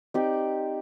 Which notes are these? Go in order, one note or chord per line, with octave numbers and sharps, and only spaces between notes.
C4 D#4 G4 D5